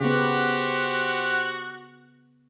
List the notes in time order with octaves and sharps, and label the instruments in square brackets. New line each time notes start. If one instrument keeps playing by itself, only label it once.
[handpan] C#3 B3 [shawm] F#4 [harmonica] G4 C5 F#5